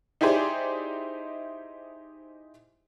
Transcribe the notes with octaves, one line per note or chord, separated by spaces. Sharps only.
D#4 E4 G4 G#4 C5 D5